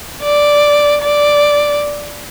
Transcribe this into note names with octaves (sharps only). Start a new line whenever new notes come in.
D5
D5